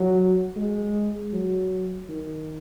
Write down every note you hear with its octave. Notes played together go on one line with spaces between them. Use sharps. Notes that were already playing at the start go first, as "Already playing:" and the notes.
Already playing: F#3
G#3
F#3
D#3